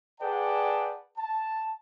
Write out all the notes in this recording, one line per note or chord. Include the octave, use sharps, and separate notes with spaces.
G#4 B4 D5 F#5 G5 A5
A5